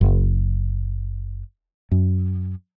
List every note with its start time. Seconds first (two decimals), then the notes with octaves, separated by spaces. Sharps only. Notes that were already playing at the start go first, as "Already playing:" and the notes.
0.01 F#1
1.91 F#2